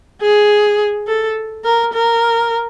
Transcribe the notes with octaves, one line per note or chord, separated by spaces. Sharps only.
G#4
A4
A#4
A#4